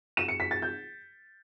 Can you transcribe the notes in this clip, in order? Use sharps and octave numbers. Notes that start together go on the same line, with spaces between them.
E7
C#7
B6
A6
G6